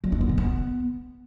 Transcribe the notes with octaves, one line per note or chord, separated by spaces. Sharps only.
F#3
D4
B3
C#3
B3